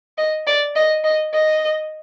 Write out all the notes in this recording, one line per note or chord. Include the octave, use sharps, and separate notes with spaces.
D#5
D5
D#5
D#5
D#5